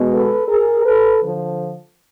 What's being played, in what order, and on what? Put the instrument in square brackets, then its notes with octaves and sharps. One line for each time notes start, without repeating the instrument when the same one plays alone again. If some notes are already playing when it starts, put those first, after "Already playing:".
Already playing: [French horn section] B2 G#3 B3
A4 B4
G#4 A#4
A4 B4
D3 F3